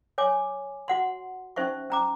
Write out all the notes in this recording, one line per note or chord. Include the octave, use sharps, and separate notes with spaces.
C#5 G#5 D6
F#4 F#5 C6
C#4 D#4 C5 E5 C#6
C#4 A#5 D6